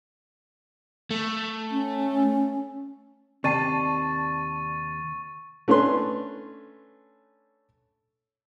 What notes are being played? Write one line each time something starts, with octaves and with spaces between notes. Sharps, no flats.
A3
C#4
D#2 C3 D5 A5 C#6 A6 C7 D#7
A3 C#4 D4 B4 C6